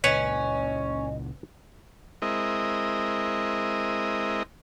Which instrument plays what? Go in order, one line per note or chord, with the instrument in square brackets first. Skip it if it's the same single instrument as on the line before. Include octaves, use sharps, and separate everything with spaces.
[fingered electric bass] C#2 A#2 C#3 [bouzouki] C#4 [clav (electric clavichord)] B4 C#5 [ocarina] D#5
[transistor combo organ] G#3 C4 E4 A#4 D#5